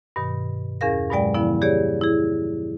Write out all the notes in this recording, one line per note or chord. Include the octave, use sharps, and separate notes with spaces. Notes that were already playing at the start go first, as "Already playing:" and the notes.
G2 B2 D#3
E2 C#4 G#4 A#4 F5 A#6
G2 B2 F#3 G#3 D5 G5
D3 F3 B3 E4
G4 G#4 C#5 D5
E4 G#4